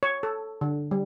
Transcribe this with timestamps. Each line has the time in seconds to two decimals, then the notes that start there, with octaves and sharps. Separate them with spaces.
0.03 C#5
0.23 A4
0.61 D3
0.91 G3